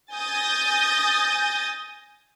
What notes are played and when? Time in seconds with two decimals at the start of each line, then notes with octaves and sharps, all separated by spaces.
0.13 G#5 D#6 G6 A6 A#6